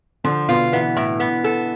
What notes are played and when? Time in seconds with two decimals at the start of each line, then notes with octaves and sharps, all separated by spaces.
0.24 D3 F3 D4
0.48 B2 B3 F4
0.73 E3 B3 E4
0.97 A2
1.20 B3
1.44 A4